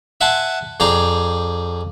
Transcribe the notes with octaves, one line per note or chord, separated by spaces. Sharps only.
E5 F#5 G#5 A5 C6
F2 G#4 D5 G5 A#5 C6